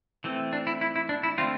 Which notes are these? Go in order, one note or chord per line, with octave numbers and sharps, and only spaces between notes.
E3 A3 C4
D4
E4
E4
E4
D4
E4
D3 A3 C4 F4